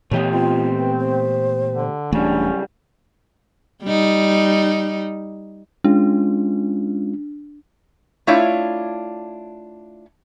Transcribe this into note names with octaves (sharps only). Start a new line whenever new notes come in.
A#2 E3 A3 B3 G4 C#5 D#5
C4 F4
B4
C5
D3
D#1 F#2 C#3 E3 G3 A3 C#4 D4
G3 D#4
G#3 C#4 D4 F4
A3 D4 E4 F4 C#5 D5